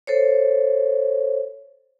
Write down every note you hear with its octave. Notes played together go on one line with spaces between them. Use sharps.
A4 C5 C#5